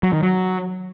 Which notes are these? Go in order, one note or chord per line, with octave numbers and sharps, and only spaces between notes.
F#3
D#3
F#3